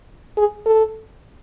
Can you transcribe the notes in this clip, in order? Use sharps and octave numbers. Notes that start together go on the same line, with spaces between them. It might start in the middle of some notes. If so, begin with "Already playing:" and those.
G#4
A4